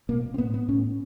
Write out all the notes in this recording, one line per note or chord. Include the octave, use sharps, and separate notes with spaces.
B2 A#3
C4
A2 B3
B3
A2 C#4